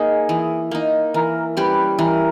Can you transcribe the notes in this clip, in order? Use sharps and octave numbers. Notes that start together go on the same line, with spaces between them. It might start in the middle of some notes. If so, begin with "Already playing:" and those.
Already playing: A#3 D#4 G#4
E3
A#3 D#4
E3 A#4
G3 C#4 G4 B4
E3 A#4